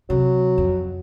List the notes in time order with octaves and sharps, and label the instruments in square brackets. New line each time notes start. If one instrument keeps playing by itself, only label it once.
[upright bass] C3 [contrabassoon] F#3
[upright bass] F2